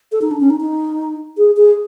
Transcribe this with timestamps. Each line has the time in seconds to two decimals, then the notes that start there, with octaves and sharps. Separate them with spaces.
0.12 A4
0.22 D#4
0.31 D4
0.40 C#4
0.50 D#4
0.61 D#4
1.38 G#4
1.57 G#4